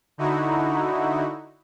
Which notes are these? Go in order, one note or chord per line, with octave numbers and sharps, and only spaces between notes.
D3 D#4 E4 F#4